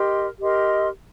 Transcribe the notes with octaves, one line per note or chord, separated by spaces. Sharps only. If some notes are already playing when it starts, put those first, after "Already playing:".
Already playing: G4 A#4 D#5 C6
G4 A#4 D#5 C6